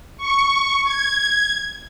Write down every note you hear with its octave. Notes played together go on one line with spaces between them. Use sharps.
C#6
G#6